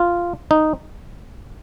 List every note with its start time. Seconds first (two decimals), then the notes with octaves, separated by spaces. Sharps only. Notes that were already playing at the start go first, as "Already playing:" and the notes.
Already playing: F4
0.51 D#4